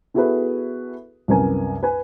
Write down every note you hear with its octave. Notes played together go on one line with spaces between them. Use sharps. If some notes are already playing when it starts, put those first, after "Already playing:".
B3 E4 F#4 G#4 A4 B4
C2 F#2 A#4 B4 G#5
B4 G#5